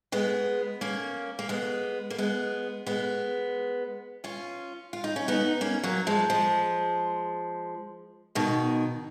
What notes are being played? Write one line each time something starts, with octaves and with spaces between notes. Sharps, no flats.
G#3 B3
A#3 C#4
A#3
G#3 B3
A#3
G#3 B3
G#3 B3
C#4 F4
F4
D#4
C#4
B3 D#4
A#3 C#4
F#3 A#3
F3 G#3
F3 G#3
B2 D#3